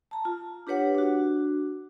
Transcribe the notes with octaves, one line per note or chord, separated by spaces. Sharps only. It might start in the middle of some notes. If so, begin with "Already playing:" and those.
A5 A#5
F4
D4 G4 B4 C#5 F#5
D4 F#4